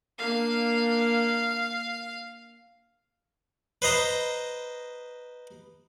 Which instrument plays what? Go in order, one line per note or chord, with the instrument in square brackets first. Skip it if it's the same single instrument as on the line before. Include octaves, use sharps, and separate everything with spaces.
[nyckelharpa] A#3 D4 [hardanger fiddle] F5
[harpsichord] B4 C5 D#5 A#5